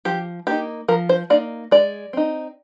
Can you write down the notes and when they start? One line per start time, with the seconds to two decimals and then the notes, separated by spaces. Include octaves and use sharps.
0.05 F3 G4
0.47 A#3 D#4 G4
0.88 F3 A#4
1.09 C5
1.30 A#3 D#4 D5
1.71 G#3 D5
2.13 C4 D#4